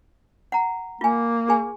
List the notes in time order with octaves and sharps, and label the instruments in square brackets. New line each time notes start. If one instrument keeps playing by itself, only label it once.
[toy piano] F#5 A#5
[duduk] A#3 [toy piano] F4 G#5
[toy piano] G#4 G#5